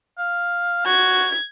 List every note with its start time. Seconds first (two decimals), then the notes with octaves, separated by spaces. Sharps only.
0.18 F5
0.86 F#4 G#6